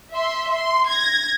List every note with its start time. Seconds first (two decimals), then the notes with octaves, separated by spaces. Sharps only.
0.13 E5 C6
0.55 C6
0.89 G#6 A#6